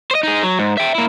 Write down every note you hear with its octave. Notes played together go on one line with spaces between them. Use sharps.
C5 D#5
D#4 G#4
F#3
G#2
E5 G5
A#3 E4